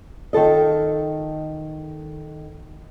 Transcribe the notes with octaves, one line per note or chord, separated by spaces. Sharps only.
D#3 F4 A4 D#5